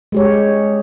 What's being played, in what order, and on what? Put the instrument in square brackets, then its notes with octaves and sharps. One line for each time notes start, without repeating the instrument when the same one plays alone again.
[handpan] G#3 G4 C#5